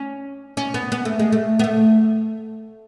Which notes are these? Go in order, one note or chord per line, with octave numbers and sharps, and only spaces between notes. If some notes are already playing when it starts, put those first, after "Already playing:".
Already playing: C#4
C#4
B3
B3
A3
G#3
A3
B3
A3